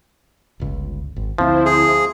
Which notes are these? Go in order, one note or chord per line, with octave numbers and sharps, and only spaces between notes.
G1 C#2
G#1
D2 F3 C4 E4 C5
G#4